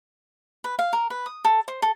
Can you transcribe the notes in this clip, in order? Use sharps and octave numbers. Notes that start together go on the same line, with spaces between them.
B4
F5
A#4
B4
D#6
A4
C5
A4